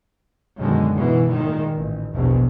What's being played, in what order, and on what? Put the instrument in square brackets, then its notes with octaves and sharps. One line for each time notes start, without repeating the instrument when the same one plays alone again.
[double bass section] F#2 B2 D3 D#3 G#3
G#2 B2 E3
A#2 D#3 G#3
A1
A#1 E2 B2